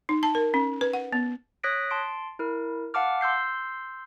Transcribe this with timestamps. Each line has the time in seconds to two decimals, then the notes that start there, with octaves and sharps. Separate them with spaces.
0.09 D#4
0.23 A5
0.35 A#4
0.54 C#4
0.81 B4
0.93 F#5
1.13 B3
1.64 C#5 D#6 F#6 A#6 B6 D7
1.91 A5 C6 D7
2.39 E4 A#4
2.94 F5 F#5 A5 D6 F6
3.21 C6 E6 G6 C7